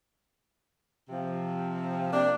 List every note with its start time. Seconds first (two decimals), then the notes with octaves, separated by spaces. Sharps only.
1.09 C3 F3
2.12 C3 A#3 D4